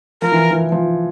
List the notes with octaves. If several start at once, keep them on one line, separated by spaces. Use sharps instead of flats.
F3 A#4
E3
E3
F3